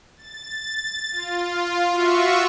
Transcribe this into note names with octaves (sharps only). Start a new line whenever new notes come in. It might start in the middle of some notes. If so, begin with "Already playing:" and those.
A6
F4
F4 F#4 E5 C#6